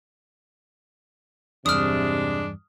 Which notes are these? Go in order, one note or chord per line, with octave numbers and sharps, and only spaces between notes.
E2 G2 C3 G#3 D4 D#6 F6